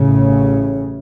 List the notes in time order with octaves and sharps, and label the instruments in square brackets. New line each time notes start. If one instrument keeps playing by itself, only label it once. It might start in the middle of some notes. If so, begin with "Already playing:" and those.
Already playing: [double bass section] A1 A2 C#3